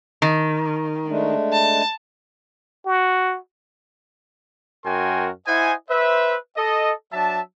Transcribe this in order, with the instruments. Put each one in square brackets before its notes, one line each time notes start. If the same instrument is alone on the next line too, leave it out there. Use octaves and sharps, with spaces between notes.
[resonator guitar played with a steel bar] D#3
[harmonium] G#3 A3 D4
[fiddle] A5
[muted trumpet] F#4
[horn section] F#2 F#4 A#4 G5 G#5 C6
E4 C5 D#5 F#5 G#5
B4 C5 E5
A4 D#5
F#3 D4 E5 A5